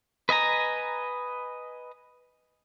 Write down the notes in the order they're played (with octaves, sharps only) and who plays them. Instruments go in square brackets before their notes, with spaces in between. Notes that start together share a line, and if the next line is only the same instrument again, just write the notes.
[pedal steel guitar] B4 D#5 G#5 A#5